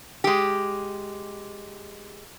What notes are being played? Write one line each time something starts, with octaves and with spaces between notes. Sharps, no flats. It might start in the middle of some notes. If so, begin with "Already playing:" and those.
G#3 G4